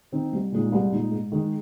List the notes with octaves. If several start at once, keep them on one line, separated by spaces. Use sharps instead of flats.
D#3 C4 D#4
C2
A#2 G#3 D#4
C2
A#2 G#3 D#4
G#2
D#3 G#3 D#4